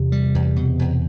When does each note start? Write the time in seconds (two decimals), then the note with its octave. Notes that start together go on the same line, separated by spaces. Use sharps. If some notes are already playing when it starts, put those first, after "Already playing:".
Already playing: E2 C3
0.12 G3
0.35 E2
0.56 B2
0.79 E2